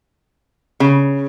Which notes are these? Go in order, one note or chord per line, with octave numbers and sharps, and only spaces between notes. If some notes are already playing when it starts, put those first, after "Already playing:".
C#3